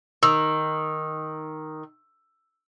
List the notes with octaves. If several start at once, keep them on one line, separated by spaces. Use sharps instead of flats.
D#3 E6